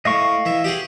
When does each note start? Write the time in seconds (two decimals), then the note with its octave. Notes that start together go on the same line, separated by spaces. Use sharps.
0.05 A2 D#5 F5 C#6
0.45 E3 E5
0.64 G4 G#4 F#5